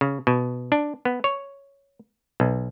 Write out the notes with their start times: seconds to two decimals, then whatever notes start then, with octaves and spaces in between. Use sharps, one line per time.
0.01 C#3
0.27 B2
0.72 D4
1.05 B3
1.24 C#5
2.40 B1